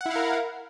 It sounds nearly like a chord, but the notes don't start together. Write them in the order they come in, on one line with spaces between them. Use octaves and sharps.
F#5 E4 F5 A#4